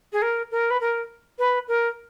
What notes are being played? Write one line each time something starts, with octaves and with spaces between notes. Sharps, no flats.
G#4
A#4
A#4
B4
A#4
B4
A#4